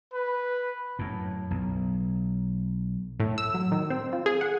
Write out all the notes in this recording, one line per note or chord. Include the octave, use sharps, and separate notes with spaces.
B4
F#2 A2
B1
A2
E6
F#3
D#3
C4
F4
G#4
F#5